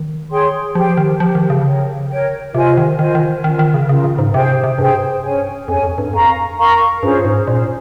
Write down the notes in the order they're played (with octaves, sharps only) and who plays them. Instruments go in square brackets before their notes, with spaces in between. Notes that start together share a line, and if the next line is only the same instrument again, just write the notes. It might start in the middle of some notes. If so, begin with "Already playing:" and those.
Already playing: [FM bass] D#3
[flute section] G#4 C#5 G5 C6
[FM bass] F3 [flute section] G4 C5 G5
[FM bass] D#3
[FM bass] F3 [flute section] G4 C5 G5
[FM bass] D#3
C#3
[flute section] A#4 C#5 G5
A#4 C#5 G5
[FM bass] C3 [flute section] F4 C5 D#5 G#5
[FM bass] D#3
[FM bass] D#3 [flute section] F4 C5 D#5 G#5
[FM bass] D#3
[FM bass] D#3 [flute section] C#4 F4 A#4
[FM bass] D#3
C#3
[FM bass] C#3 [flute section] C#4 F4 A#4
[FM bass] C#3
G#2
[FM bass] C3 [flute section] G#4 C5 G5
[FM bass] C3
[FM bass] G2 [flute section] G#4 C5 G5
[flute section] C#4 G#4 C#5 G#5
[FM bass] F2 [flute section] C#4 G#4 C#5 G#5
[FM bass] F2
G2
[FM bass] F2 [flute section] A#4 F5 A#5 C#6
[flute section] A#4 F5 A#5 C#6
[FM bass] G2 [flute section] C#4 F4 G#4 C5
[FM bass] G#2
[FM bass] A#2 [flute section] C#4 F4 G#4 C5